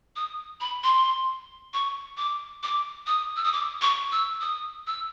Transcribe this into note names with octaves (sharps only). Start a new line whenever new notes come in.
D#6
B5
C6
C#6
D6
D6
D#6
E6
D#6
D6
C#6
E6
D#6
E6